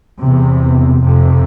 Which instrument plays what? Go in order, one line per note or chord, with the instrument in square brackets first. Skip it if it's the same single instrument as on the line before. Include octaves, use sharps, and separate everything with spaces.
[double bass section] E2 C3
F2 C3